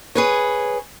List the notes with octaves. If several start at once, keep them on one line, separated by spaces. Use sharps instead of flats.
G#4 B4 C#5